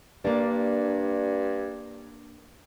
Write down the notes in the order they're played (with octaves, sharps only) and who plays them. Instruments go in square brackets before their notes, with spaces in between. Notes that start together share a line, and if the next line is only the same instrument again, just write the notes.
[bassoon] G2 [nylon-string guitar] A#3 D4